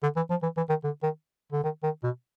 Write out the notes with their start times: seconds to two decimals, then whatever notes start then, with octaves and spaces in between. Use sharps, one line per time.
0.03 D3
0.16 E3
0.30 F3
0.42 E3
0.57 E3
0.69 D#3
0.84 D3
1.03 D#3
1.52 D3
1.63 D#3
1.83 D#3
2.04 B2